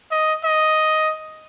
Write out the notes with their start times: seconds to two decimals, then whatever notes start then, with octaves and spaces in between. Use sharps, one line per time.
0.11 D#5
0.44 D#5